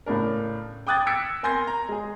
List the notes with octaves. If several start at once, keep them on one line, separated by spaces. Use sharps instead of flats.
A2 C#3 D4 A#4
G5 D6 D#6 F#6 G#6 A6
E6 G#6 A#6 B6 C#7 D7
A#4 G#5 C6 G6 G#6 A#6
A#5
G#3 G#4